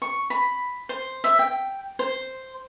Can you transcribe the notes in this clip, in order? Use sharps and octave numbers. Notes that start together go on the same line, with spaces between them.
C#6
B5
C5
E5
G5
C5